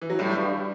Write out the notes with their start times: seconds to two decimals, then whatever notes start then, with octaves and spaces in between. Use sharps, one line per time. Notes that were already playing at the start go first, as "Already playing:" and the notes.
0.02 E3
0.10 F#3
0.19 A2 G3
0.35 G2